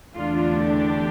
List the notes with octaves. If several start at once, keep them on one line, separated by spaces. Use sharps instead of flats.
E2 D3 A3 D4 F4
G4